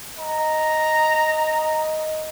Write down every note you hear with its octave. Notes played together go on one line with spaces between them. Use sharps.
D#5 A#5